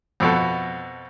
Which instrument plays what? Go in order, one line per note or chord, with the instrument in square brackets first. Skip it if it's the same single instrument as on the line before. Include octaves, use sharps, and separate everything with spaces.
[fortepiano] F2 B2 A4